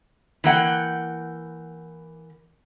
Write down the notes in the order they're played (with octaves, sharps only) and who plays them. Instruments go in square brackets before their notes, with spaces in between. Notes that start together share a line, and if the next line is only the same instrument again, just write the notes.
[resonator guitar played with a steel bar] E3 A#3 F#5 G5